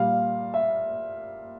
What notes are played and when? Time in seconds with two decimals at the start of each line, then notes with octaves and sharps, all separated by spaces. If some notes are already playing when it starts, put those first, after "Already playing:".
Already playing: A#2 G3 F5
0.54 E5